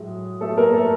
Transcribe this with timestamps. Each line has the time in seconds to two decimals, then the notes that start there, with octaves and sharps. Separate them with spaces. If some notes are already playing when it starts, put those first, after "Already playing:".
Already playing: A2 F#3 G#3
0.41 A3 A4
0.57 A#3 A#4
0.73 A3 A4